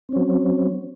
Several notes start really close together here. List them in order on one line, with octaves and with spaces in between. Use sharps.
C4 C#4 F#3